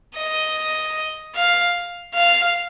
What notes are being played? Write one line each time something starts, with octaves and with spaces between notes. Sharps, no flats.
D#5
F5
F5